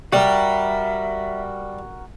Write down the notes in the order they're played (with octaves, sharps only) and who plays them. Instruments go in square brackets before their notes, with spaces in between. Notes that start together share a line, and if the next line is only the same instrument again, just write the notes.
[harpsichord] G3 [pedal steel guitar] F#4 A#4 [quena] E5